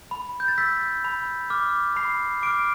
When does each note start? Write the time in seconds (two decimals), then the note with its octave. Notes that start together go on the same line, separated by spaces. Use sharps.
0.11 B5
0.40 G6
0.48 A6
0.58 E6 G6 B6
1.05 B5
1.50 D6 F6
1.96 B5 C7
2.43 D6 F6 D7